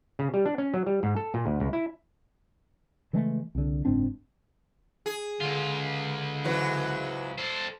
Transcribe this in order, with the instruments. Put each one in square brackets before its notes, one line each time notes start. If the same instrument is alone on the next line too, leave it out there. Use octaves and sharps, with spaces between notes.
[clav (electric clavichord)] C#3
G3
D4
C#4
F#3
G3
G#2
A4
A#2
D2
C#2
E4
[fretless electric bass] C#3 E3 G#3 A3
C2 D3
F#1 G#2 C4 D4
[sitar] G#4
[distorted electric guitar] C#2 F4 [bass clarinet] D3
[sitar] G#2 E3 F#3
[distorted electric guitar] A4 C5